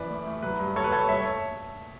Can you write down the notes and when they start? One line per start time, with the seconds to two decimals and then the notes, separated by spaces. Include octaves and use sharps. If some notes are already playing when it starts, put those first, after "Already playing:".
Already playing: F#2 E3 B4 D5
0.10 A3
0.26 A3
0.42 F#3 B4
0.60 G2
0.75 G2 A4 C#5
0.84 B4
0.92 A3 A4 C#5
1.08 G2 C#5 E5
1.25 A4 C#5